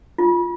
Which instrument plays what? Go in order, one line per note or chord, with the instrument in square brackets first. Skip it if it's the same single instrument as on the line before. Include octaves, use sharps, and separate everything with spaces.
[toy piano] F4